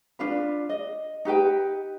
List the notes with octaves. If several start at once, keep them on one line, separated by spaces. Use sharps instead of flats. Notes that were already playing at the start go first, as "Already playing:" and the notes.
D4 F4 B4
D#5
D#4 G4 B4 G5